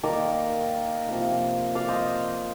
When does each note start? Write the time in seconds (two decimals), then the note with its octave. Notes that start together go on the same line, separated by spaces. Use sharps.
0.03 D#3 A#3 A#4 D5
1.09 C3 F3 A#3
1.75 D5 F5
1.88 C5 D#5